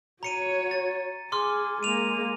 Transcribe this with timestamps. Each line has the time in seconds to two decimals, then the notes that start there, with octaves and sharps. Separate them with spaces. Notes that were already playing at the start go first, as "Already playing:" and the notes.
0.23 F#4 C#5 A#5 C#7 D#7
0.71 A6
1.32 G#4 C6 D6 F6
1.83 G#3 A#3 D#7 F7